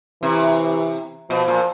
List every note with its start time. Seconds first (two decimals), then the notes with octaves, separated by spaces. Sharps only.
0.23 C3 E3
1.30 B2 F3
1.48 A#2